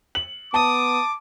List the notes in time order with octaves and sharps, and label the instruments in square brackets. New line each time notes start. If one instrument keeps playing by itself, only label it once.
[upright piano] F#7
[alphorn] B3 [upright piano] A5 [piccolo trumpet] D6 [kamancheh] D#6